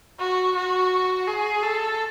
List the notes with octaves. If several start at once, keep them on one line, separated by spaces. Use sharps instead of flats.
F#4
F#4
G#4
A4